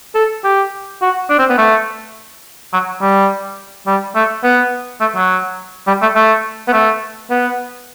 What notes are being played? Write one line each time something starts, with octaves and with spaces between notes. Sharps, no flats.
A4
G4
F#4
D4
C4
B3
A3
F#3
G3
G3
A3
B3
A3
F#3
G3
A3
A3
B3
A3
B3